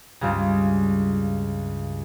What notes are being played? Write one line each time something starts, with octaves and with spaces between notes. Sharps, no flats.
C#2 G2 C#3